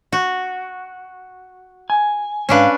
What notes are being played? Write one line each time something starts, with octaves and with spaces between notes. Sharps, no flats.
F#4
G#5
G#2 C#4 D4 B4 F5